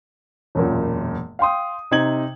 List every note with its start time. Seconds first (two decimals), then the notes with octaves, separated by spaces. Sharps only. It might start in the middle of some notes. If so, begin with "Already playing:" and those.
0.55 E1 F#2 A#2
1.39 F5 G5 C6 D#6
1.91 C3 D#4 C5 G#6 F#7